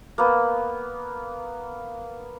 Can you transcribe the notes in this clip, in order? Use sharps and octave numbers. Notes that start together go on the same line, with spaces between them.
A#3 B3